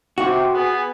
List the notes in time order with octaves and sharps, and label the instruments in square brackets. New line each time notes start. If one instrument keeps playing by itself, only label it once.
[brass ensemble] C3 [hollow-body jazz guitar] F#4
[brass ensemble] B3 G#4